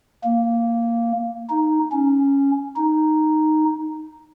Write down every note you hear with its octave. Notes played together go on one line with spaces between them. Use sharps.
A#3
D#4
C#4
D#4